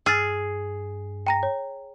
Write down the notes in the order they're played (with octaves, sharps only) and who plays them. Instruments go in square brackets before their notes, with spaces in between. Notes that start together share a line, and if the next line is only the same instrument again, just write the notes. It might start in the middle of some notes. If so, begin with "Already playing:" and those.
[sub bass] G2 [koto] G#4 [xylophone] E6 F6 A6
[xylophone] G5 A#5 A#6
C#5